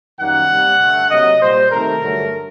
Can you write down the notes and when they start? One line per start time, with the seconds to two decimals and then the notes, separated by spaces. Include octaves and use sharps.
0.19 F#2 D#3 G3 A#3 F#5
0.50 C3 G3 A#3
0.80 G2 D3 A3
1.10 C3 F#3 A#3 D#5
1.40 A#2 G3 A#3 C5
1.70 C3 D#3 A3 A#4
2.01 G2 D3 F#3 A3